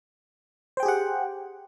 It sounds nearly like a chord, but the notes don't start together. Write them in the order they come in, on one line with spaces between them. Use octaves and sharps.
C5 G5 G#4 G4 F#5